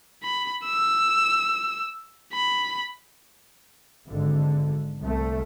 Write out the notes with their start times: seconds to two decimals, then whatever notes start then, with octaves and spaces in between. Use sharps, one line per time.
0.23 B5
0.65 E6
2.33 B5
4.09 G#1 D3
5.02 C2 A3